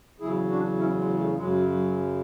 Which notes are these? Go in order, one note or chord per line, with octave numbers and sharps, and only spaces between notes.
E2 C#3 F#3 E4 G#4
D4 F#4
C#4 E4
G#3
F#3 A3
F#2 C#3 F#3 G#3
F#3